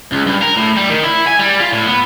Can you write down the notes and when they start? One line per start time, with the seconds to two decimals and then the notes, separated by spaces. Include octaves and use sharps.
0.12 C#2
0.27 G2
0.43 A#4
0.57 A2
0.77 G3
0.89 D#3
1.04 E4
1.27 G#5
1.39 G3
1.61 F4
1.73 A2
1.86 B3